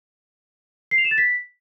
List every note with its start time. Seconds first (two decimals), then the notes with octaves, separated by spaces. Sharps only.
0.91 C7
0.98 F7
1.05 E7
1.11 A6
1.18 B6